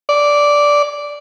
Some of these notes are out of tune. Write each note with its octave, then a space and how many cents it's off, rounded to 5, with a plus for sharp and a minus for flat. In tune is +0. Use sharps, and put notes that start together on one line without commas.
D5 -5